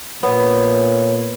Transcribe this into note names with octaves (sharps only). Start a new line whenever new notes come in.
A#2 B3 C#5